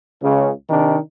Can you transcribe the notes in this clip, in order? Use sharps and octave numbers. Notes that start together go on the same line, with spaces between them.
C#2 C#3
C3 D#3 D4 D#4